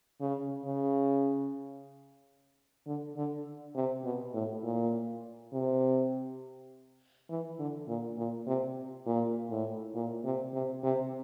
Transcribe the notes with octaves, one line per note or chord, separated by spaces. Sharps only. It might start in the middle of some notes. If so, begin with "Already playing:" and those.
C#3
C#3
D3
D3
C3
B2
A2
A#2
C3
E3
D3
A#2
A#2
C3
A#2
A2
A#2
C3
C3
C3